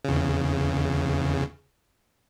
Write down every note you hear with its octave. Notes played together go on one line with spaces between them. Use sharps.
E2 C#3